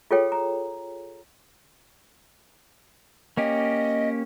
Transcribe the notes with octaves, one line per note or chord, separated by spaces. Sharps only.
F4 G#4 A4 C#5 G5
A#5
A#3 C#4 G4 D#5